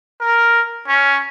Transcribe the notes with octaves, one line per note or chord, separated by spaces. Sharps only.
A#4
C#4